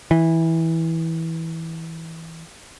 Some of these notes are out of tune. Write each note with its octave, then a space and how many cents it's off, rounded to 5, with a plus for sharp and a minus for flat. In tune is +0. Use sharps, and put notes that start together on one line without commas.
E3 -15